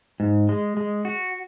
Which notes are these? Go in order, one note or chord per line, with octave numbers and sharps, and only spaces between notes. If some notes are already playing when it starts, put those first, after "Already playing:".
G#2
G#3
G#3
F#4